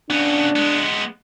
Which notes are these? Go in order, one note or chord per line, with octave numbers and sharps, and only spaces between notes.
C#3 B3 D4
G#3 B3